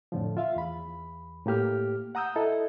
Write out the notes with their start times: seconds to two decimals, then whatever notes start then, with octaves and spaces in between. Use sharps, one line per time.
0.12 F2 A2 D3 F3
0.37 F4 E5 F5
0.56 E2 B5
1.46 A2 A#3 G4 F6
2.15 F#5 A#5 D#6 E6 G6
2.36 E4 A4 D#5